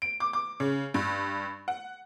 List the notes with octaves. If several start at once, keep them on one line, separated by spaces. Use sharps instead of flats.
D7
D6
D6
C#3
G2
F#5